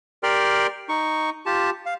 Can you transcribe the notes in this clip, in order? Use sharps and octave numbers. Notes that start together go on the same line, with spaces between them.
G4 A#4 D5 G5 C6 F6
D#4 C#6
F4 G4 A5
F5